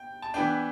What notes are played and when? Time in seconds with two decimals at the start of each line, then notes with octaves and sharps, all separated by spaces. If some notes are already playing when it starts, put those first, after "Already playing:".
Already playing: G5
0.22 A5
0.34 E3 B3 D4 G5